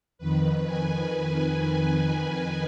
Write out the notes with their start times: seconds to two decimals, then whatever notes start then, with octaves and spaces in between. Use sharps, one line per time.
0.18 F2 D#3 B4
0.65 G#5